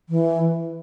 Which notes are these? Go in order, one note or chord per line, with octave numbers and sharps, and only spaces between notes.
E3